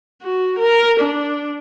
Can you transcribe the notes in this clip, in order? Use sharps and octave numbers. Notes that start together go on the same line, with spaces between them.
F#4
A#4
D4